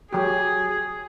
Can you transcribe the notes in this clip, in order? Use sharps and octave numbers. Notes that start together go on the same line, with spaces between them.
F#3 G4 G#4